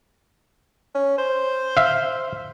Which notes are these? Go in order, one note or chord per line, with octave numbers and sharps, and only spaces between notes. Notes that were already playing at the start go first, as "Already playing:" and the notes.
C#4
C5
E5 F5